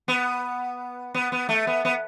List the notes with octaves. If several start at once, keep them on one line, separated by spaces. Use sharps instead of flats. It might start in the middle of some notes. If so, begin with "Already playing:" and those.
B3
B3
B3
A3
B3
B3